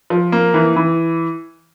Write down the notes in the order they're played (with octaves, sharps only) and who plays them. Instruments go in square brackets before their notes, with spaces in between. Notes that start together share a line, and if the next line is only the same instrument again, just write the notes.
[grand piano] F3
A#3
E3
E3